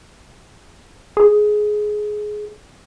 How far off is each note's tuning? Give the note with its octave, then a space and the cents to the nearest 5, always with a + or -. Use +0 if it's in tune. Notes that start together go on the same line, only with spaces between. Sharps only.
G#4 +15